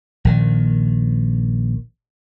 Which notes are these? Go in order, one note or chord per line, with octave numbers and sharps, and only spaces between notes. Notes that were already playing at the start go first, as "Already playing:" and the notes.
A#1 D#3